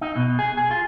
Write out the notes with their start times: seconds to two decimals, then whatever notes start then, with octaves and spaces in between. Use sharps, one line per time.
0.01 D#4
0.16 B2
0.39 G#4
0.57 G#4
0.71 F4